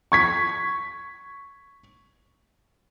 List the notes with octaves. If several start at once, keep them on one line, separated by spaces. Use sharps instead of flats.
C#6 G#6 B6